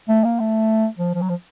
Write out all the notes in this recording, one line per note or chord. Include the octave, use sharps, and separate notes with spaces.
A3
A#3
A3
F3
F3
F#3
F3